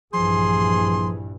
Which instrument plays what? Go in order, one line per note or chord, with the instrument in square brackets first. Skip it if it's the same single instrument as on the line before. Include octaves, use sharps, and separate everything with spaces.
[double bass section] A#1 G2 E3 [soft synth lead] F3 [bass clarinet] G#4 [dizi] C6